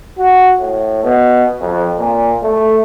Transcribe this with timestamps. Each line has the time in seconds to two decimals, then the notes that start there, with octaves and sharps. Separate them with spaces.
0.18 F#4
0.60 A2
1.03 B2
1.61 F2
1.98 A#2
2.43 A3